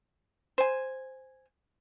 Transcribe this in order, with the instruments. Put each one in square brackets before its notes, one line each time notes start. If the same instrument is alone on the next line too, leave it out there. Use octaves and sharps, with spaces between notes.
[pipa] C5 G#5